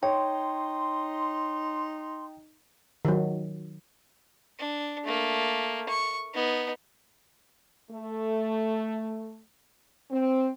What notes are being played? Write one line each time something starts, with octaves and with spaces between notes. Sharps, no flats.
D#4 C#5 G5 C6
D#3 F#3
D4
A3 A#3
C#6
B3 D#4
A3
C4